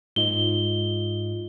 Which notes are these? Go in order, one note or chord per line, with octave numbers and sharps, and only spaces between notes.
G#2 F4 D#5 G7